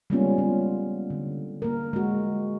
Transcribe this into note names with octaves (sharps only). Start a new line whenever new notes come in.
G3 G#3 A#3 B3 C#4 F4
F4
D3
A#3 A#4
G#3 F#4